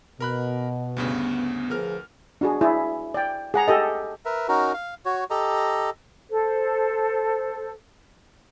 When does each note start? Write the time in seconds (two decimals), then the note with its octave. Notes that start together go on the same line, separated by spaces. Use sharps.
0.20 B2 A#4 B5 F#6
0.97 D2 G2 C#3 B3
1.70 D2 F3 G#4 A#4 B4 F6
2.41 D4 F#4 G#4
2.61 E4 G#4 D5
3.14 D5 G5
3.54 G#4 F#5 A#5
3.68 G4 A4 D#5
4.25 A#4 B4 E5
4.48 C#4 D#4 F#4 A#4
4.74 F5
5.05 F#4 C#5
5.30 G4 A4 D#5 A#5
6.30 A4 C5